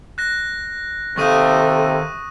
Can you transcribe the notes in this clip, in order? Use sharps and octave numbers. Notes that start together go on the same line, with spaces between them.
F#6 A#6
C3 D#3 A4 F5 C#6 D#6 D#7